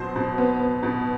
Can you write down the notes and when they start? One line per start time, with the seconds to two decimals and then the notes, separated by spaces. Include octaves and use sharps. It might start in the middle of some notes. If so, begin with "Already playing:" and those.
Already playing: B2 F#3 C5
0.16 B2
0.38 B3
0.60 B3
0.83 B2